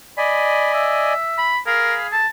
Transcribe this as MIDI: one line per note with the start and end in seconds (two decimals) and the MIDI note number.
0.18 1.13 74
0.18 1.13 75
0.18 1.13 80
0.18 0.72 83
0.74 1.52 76
1.38 1.58 83
1.67 2.23 68
1.67 1.95 70
1.67 2.07 77
1.67 2.07 83
1.67 2.07 89
2.12 2.27 81